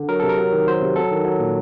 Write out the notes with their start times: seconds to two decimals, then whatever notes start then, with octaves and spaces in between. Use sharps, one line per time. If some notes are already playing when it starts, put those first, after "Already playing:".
Already playing: D3
0.09 F#3 A#4
0.20 C3 A4
0.29 A#4
0.38 F#3
0.52 D#3
0.67 F#3 C5
0.81 C3
0.96 F#3 A4
1.11 D#3
1.25 F#3
1.40 A#2